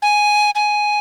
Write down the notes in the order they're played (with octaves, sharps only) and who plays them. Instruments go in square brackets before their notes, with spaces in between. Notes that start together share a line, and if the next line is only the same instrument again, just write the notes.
[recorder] G#5
G#5